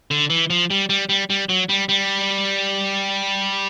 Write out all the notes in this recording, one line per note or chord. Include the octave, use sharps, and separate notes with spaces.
D3
E3
F3
G3
G3
G3
G3
F#3
G3
G3